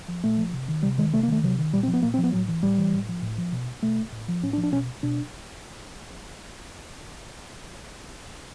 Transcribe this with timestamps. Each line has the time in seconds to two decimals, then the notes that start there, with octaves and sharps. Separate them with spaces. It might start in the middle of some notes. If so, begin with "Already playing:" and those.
0.08 F3
0.24 A#2 A3
0.38 F3
0.53 C3
0.68 D#3
0.83 C3 G3
0.98 D#3 G#3
1.13 C3 A3
1.23 A#3
1.28 D#3 A3
1.43 C3 F#3
1.58 D#3
1.73 A#2 G3
1.83 C4
1.88 F3
1.94 B3
2.03 A#2 A#3
2.14 C4
2.18 F3
2.24 B3
2.33 A2 F#3
2.48 E3
2.63 A2 G3
2.79 E3
2.94 A2
3.09 F3
3.22 A2
3.38 F3
3.53 B2
3.83 B2 A3
4.12 A2
4.29 F3
4.44 A2 C#4
4.53 D4
4.58 F3
4.63 D4
4.72 B2 C#4
5.03 B2 D4